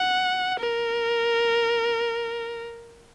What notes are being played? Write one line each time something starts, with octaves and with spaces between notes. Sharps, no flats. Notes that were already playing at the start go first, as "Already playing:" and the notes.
Already playing: F#5
A#4